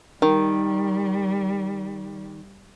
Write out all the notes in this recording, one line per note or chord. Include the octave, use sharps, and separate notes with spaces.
D#3 G3